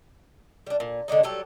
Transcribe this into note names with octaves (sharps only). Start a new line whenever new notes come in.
G3 D4
A#2
D3 G#3 D4 D#4
F#3 G3 G4 A4